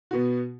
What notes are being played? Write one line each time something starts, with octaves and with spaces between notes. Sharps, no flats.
B2 B3 F#4